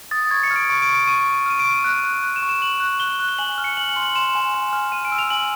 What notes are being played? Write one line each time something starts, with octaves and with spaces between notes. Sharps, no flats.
D#6 A6
C#6 G#6
C#7
F6
D7
C#6 D7
D7
C#6
D7
C#6 D#7
C#6
F6 D#7
D7
C#6
D#7
F#6
F#6
F#6
E7
C#6
E7
C#6 F#7
F#6
F#6 G7
F#6
G7
G#5 F#7
F6
C#7
G#5 F#7
F#7
C6
F#7
C6 E7
G#5
G#5
F6
G#5 D#7
D7
E6
F7
G#5 F#7